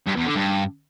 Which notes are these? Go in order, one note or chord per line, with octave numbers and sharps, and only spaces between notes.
G2
E2
D3
G2